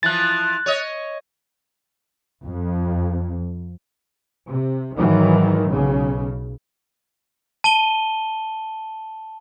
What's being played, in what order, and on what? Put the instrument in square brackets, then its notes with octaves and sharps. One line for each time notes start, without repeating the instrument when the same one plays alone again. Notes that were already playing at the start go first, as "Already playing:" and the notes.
[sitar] E3 F3 [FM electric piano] F#6 A6
[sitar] C#5 D#5
[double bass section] F2
C3
G#2 D#3 E3 F#3
B1 C#3
[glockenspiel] A5 D#7 G7